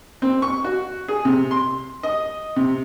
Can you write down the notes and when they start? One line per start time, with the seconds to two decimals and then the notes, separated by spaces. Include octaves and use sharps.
0.22 C4
0.42 C#6
0.64 F#4
1.08 G#4
1.25 C3
1.51 C6
2.03 D#5
2.56 C3